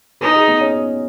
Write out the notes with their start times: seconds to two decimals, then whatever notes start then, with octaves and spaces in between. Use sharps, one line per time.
0.21 D#4 B4
0.35 G#4
0.48 B3
0.61 C#4